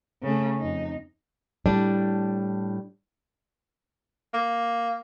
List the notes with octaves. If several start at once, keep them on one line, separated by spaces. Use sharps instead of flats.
C#3 A3
F2 D#4
A2 G3 D4
A#3